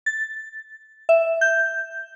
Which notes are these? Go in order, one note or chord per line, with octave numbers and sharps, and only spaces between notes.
A6
E5
G6